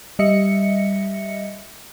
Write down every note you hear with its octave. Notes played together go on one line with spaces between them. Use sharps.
G3 D#5 E5 C#7